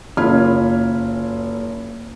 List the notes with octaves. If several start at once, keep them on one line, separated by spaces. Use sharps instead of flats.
F#1 C#4 F4 B5 F6 G#6